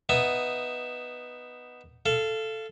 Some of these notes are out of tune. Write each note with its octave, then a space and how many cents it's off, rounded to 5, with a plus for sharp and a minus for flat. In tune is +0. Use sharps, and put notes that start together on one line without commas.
B3 +0 D#4 +0 E5 +10
A4 +0 F5 -25